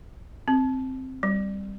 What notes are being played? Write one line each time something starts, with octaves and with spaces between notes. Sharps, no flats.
C4
G3